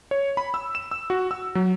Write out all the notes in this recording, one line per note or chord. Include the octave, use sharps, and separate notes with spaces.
C#5
B5
E6
E7
E6
F#4
E6
F#3